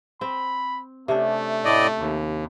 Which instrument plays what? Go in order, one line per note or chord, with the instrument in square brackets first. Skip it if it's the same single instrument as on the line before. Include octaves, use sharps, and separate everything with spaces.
[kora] C4 [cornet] B5
[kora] C3 C#4 D4 [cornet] A3
[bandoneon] A2 D5 D#5
D#2